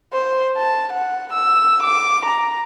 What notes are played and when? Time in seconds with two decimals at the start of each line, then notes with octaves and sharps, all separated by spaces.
0.13 C5
0.57 A5
0.93 F#5
1.33 E6
1.83 D6
2.26 A#5